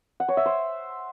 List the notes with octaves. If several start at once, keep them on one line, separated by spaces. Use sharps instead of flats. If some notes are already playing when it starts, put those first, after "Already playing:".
F#5
C#5
E5
C5